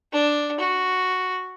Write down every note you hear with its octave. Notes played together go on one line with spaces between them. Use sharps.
D4
F#4